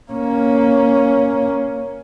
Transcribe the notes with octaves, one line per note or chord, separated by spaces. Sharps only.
A#3 C#4